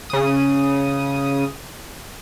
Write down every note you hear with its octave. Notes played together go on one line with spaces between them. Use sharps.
C#3 D#6